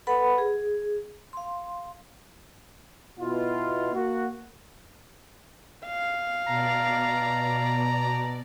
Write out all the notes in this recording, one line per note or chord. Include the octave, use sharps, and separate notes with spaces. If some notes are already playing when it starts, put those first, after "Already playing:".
A4 B4 F#5 B5
G#4
F5 C6
B2 E4 F4
A#3 F#4
F5
B2 D5 A5 A#5